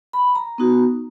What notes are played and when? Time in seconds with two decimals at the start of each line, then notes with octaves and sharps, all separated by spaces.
0.13 B5
0.35 A#5
0.58 B3 D#4 F#4